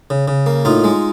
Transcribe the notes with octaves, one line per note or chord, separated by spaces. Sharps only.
C#3
C#3
A#3
A2 D#4 F4
G#3